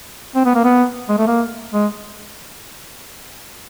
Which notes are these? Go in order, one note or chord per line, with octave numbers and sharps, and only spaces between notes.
C4
B3
A#3
B3
G#3
A3
A#3
G#3